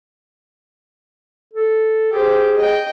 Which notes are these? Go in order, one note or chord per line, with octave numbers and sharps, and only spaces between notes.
A4
G4 G#4 C5
D#5 G5